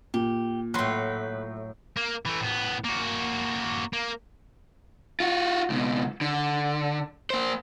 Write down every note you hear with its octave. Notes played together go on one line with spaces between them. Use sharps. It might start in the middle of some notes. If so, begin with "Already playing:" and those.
A#2 G4
A2 F#3 B4 C6
A#3
E3 A3
A2 B3
A#3 F#4
A#3
F4 F#4
C#2 B2
D3
A#3 C5